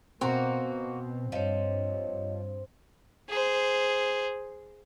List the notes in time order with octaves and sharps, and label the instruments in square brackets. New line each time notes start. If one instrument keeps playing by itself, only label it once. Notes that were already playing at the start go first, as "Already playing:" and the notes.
[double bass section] B2 [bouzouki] A#3 F#4 [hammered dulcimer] C4
[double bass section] G2 [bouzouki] F3 [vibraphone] C#5 D#5
[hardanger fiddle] G#4 C5